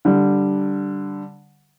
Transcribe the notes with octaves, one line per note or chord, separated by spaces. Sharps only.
D3 G3